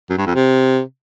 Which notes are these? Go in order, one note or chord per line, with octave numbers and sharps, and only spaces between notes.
F#2
G2
F2
C3